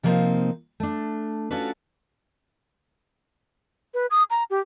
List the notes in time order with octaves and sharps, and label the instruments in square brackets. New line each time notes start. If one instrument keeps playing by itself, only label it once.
[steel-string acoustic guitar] C3 F3 G3 A#3 C4 D#4
A3 D4
C#4 D4 F4 F#4 A4 B4
[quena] B4
D#6
A#5
G4